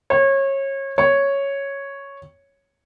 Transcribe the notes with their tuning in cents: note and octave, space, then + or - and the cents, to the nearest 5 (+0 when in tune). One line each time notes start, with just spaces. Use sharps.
C#5 -25
C#5 +0